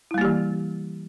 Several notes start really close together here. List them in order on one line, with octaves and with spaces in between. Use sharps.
E4 G3 A#3 G4 E3